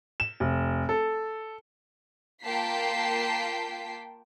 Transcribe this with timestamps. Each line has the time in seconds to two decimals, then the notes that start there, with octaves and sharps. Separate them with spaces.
0.20 E7
0.40 F1
0.89 A4
2.43 A#3 F4 G5 A5 B6 C7